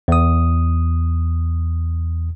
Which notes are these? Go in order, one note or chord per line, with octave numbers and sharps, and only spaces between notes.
E2 D#6